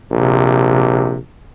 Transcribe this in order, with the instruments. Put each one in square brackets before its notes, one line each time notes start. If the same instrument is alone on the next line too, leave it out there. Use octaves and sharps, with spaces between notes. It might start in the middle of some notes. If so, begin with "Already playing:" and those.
[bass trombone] A#1 [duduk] C3